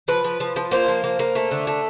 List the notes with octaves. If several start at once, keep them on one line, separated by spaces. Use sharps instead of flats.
F3 B4
F3
F3
F3
A#3 C5
F3
A#3
A#3
A3
D3
A3